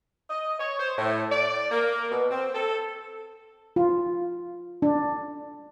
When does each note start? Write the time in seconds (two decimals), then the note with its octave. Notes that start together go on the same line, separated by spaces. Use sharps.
0.30 D#5
0.60 C#5
0.79 C5
0.98 A2
1.30 D5
1.71 A#3
2.11 B2
2.31 C4
2.55 A4
3.76 F4
4.82 D4